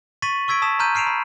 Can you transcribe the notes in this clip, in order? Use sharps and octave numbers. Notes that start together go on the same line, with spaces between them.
C#6 A6 B6 D#7 F#7
C#6 E6 G#6 B6 D7
A5 D#6 B6 E7
A#5 C6 F6 G6 D#7
F6 C7 D7 E7 F7
B5